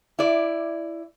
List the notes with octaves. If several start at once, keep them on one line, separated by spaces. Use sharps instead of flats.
E4 D5